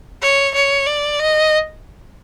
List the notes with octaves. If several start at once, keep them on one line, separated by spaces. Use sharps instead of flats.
C#5
C#5
D5
D#5